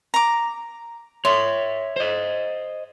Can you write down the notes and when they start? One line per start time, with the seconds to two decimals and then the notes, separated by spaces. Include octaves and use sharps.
0.14 A#5 D6
1.25 C#5 E5 C6
1.96 C5 D#5